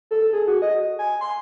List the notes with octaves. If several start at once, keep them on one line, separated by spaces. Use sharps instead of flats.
A4
G#4
F#4
D#5
G#5
C6